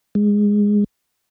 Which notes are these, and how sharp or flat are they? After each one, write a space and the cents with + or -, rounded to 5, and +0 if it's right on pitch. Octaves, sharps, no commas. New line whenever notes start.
G#3 -10